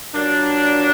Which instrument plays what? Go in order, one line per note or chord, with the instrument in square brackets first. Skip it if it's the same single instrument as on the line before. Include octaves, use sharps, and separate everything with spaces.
[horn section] A#2 F#3 A#3 D4